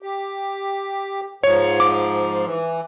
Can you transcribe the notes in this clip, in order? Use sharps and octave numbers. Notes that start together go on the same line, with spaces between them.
G4
G#2 F3 C#5
D6
E3